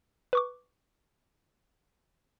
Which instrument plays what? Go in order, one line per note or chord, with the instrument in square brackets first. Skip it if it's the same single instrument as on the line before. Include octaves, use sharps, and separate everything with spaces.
[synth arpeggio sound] B4 C#6 D6